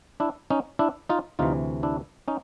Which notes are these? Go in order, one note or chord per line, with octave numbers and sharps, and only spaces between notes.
D4 E4
C#4 D#4
D4 E4
D#4 F4
D2 C3 E3 D#4 F4
D4 E4
C#4 D#4